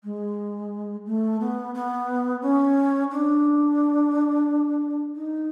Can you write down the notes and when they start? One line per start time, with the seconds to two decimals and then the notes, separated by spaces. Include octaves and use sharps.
0.04 G#3
1.06 A3
1.40 B3
1.75 B3
2.42 C#4
3.11 D4
5.15 D#4